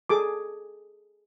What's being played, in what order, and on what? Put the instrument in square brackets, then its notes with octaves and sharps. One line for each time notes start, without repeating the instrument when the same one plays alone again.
[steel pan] G#4 A4 D6